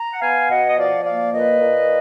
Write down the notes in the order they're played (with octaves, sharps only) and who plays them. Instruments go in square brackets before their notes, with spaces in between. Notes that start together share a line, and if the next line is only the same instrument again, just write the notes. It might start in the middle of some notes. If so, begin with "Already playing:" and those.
Already playing: [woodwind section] A#5
F#5
B3 F5 G#5
B2 D#5 F#5
D#5
F3 D5 F5
A#3 D5 F5
A#2 B4 D#5
A#2